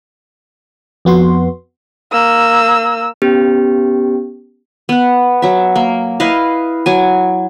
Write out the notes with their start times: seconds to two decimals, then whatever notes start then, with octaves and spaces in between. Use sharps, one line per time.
1.05 F2 B3 F#4 C6
2.12 A#3 E6
3.22 B3 C#4 G4
4.89 B3 F#5
5.42 F#3 E5
5.76 A#3
6.20 E4 B4 D#5 F5
6.86 F#3 G#5